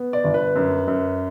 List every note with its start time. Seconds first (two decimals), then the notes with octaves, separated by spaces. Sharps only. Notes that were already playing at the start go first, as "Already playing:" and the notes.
Already playing: B3
0.13 D5
0.24 G1
0.34 B4
0.56 F#2
0.88 F#2